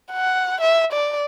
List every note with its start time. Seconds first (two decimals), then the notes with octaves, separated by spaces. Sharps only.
0.13 F#5
0.61 E5
0.92 D5